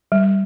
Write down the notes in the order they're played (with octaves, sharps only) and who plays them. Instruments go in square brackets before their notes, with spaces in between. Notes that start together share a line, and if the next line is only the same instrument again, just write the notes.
[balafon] G3